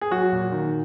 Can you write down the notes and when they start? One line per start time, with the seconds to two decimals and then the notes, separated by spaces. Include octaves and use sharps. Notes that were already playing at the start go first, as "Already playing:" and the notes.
0.01 G#4
0.11 F#3 F#4
0.32 A#2
0.52 D#3